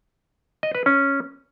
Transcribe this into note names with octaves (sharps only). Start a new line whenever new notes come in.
D#5
B4
C#4